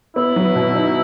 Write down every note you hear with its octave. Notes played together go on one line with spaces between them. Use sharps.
B3 E4
F#3
B2
D#4